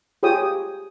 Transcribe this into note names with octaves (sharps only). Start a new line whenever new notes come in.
F4 G4 G#4 C#5 G5 D#6